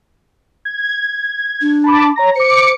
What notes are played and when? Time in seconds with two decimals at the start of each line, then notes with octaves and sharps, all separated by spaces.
0.65 G#6
1.61 D4
1.84 A5 B5 D6
2.16 C#5 A#5 A#6
2.36 C5 D6 C#7